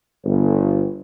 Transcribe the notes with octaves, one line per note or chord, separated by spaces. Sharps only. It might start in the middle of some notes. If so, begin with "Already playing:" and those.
G1